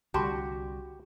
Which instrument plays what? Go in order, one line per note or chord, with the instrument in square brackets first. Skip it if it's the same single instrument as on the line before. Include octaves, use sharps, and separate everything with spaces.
[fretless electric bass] C2 D3 G3 [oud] F#4 [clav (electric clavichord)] G4 [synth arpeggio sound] A5 B5 C6